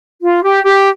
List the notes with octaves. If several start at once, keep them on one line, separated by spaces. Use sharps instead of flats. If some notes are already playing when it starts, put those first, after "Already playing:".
F4
G4
G4